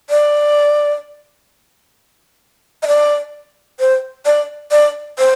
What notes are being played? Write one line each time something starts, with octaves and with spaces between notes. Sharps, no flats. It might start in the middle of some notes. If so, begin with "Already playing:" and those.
D5
D#5
D5
C5
D5
D5
C5